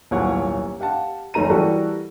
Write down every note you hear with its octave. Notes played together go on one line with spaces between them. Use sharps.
D#1 B1 A2 F4 C#5 F#5
G4 F5 F#5 A5
F#1 D#3 A3 A#5 D#7
E3 G3 F#4 A4 A#4